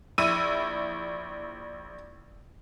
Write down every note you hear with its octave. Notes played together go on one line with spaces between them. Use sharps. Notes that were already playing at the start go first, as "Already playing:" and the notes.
A#1 E4 E6 D#7